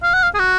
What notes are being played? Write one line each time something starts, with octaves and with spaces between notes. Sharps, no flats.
F5
F#5
F5
G#4
F#4